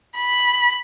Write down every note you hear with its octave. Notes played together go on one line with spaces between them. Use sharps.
B5